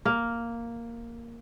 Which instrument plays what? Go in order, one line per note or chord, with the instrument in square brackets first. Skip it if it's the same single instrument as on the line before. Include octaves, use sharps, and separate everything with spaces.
[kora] A#3